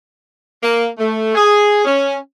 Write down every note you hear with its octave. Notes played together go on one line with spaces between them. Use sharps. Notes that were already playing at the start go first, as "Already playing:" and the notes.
A#3
A3
G#4
C#4